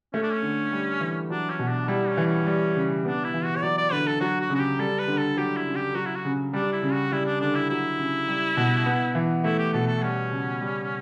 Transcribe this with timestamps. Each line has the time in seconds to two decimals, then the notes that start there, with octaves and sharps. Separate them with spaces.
0.13 A3 C#4
0.23 D4
0.32 C#4
0.42 D3
0.72 G3
1.01 E3
1.30 F#3 D4
1.50 C#4
1.59 B2
1.69 D4
1.88 G3 E4
2.08 C#4
2.17 E3
2.26 C#4
2.46 G3
2.75 C#3
3.05 B3 D4
3.24 E4
3.34 E3
3.44 F#4
3.56 C#5
3.62 F#3 D5
3.78 D5
3.92 D3 B4
4.07 A4
4.20 F#3 F#4
4.40 F#4
4.50 C#3
4.55 F#4
4.60 G4
4.79 G3 A4
4.99 B4
5.08 D3
5.18 A4
5.37 F#3 G4
5.57 E4
5.66 C#3
5.76 G4
5.95 F#3 F#4
6.05 E4
6.15 F#4
6.25 C#3
6.53 G3 D4
6.72 E4
6.83 C#3
6.92 F#4
7.12 G3 E4
7.26 D4
7.41 D3 D4
7.55 E4
7.69 F#3 E4
7.99 C#3
8.28 G3
8.57 B2
8.86 B3
9.15 E3
9.44 A3 E4
9.58 G4
9.73 B2 A4
9.87 A4
10.02 G3 C#4
10.31 C#3
10.61 G3